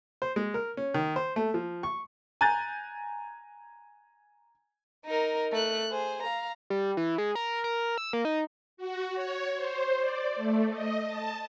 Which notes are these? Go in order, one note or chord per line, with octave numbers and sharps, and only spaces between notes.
C5
G#3
A#4
C#4
D#3
C5
A3
F3
C#6
G#5 A#5 F#6 G6 A6
D#4 A#4
A3 F#6
G#4 C5
F5 A#5
G3
E3
G#3
A#4
A#4
E6
A#3
D#4
F#4
C#5
C5
D5
A3
D#5
A5